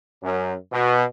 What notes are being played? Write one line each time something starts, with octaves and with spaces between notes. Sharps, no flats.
F#2
B2